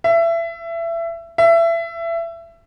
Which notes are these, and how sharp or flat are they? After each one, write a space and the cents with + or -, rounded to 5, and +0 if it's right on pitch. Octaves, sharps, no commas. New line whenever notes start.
E5 +25
E5 +25